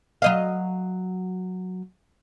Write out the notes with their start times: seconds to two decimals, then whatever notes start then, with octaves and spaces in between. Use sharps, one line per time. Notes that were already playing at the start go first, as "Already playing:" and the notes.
0.22 F#3 D#5 F5